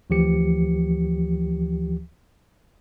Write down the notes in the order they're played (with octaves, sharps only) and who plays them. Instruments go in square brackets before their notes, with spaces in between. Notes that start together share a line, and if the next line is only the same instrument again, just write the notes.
[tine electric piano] D2 E3 F3 G4 C#7